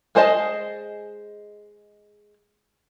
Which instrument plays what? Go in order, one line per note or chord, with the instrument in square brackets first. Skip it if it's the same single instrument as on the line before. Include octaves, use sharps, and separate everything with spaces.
[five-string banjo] G#3 G#4 C5 D#5 A5